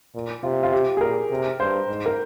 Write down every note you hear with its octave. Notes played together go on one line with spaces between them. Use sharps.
A#2
C3 F4
F4
G4
G#4
A#2 A#4
C3
G2 C5
G#2
A#4